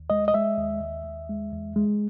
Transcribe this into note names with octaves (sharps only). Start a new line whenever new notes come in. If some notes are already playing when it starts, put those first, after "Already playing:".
Already playing: D#2
G#3 D#5
D#5
G#3 E5
D#2
D#2
D#2
G#3
E2
G#3